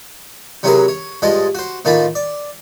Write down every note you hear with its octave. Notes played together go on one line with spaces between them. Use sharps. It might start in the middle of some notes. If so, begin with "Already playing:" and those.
C3 F#3 C#4 E4 G#4 A#4
C#5
G2 F3 G#3 D#5 A5
F#4 C5
A2 D#3 A#3 F4 A5 B5
D5